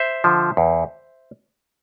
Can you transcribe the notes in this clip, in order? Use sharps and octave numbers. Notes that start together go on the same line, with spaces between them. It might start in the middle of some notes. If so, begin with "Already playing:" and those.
Already playing: C5 E5
D3 F3
E2